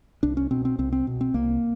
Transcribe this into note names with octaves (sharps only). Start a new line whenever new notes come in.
C2 D4
C#4
B2 C4
C4
C2 C4
C4
B2
C4
C2 A#3